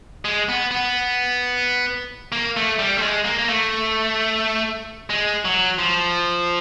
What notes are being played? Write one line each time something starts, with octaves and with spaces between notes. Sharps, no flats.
G#3
B3
B3
A#3
A3
G3
A3
G#3
A#3
A#3
A3
G#3
F#3
F3